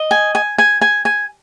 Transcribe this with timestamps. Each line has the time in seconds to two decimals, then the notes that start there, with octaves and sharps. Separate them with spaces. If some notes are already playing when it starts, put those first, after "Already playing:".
Already playing: D#5
0.11 G#5
0.35 G#5
0.58 G#5
0.81 G#5
1.05 G#5